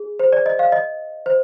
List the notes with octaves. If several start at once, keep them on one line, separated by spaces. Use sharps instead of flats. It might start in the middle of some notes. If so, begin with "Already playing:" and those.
Already playing: G#4
C5
D5
D#5
F5
D#5
C5